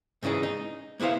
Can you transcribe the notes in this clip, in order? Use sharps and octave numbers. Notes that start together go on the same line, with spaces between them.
G#2 C#3 E3 D#4 G#4
D#4
A#3 B3 E4 C5 F5